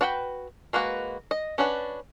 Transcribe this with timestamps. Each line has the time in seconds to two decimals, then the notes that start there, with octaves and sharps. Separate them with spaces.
0.01 D4 F#4 B4 G5 B5
0.73 G#3 A#3 F#4 B4
1.31 D#5
1.58 C#4 D4 F#4 B4